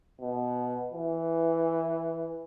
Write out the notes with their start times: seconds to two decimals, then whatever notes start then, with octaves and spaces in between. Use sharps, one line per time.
0.21 B2
0.93 E3